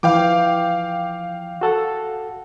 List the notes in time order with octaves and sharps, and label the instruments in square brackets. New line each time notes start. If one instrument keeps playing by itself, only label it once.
[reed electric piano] E3 F3 [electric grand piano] F5 G5 D6
[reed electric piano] F#4 A4 F#5